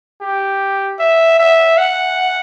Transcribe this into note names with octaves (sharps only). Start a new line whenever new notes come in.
G4
E5
E5
F#5